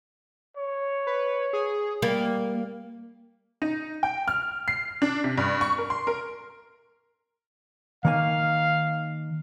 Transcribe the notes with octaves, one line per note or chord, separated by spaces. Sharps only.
C#5
B4
G#4
G3 A#3
D#4
G5
F6
C7
D4
C3
G2
C#6
A#4
C6
A#4
D#3 A#3 F5 G#5